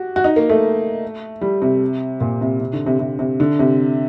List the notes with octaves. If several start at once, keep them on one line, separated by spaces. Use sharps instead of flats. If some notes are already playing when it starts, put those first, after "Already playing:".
Already playing: F#4 G4
F#4
D#4
A#3
A3
G3
C3
A#2
C3
C3
D3
C3
C3
C3
D3
C3